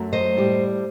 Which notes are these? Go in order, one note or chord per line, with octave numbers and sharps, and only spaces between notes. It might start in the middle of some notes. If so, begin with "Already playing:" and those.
Already playing: F#2 F#3 A3
C5 D#5
A2 G3